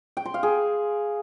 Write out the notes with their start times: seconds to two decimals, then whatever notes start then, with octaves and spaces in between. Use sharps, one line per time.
0.17 G5
0.25 C6
0.34 F5
0.43 G#4